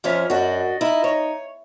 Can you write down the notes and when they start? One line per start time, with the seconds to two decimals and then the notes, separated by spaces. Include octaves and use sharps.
0.04 F2 F3 C#4 E5
0.30 F#2 D4 F#4 D#5
0.81 D#4 E4
1.04 C#5